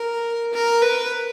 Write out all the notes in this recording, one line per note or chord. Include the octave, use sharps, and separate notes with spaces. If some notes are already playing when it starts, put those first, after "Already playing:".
Already playing: A#4
A#4
B4